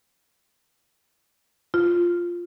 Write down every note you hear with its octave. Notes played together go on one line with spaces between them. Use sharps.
F4